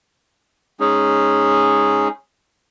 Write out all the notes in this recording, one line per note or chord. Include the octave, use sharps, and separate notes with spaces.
G#3 C#4 D#4 G#4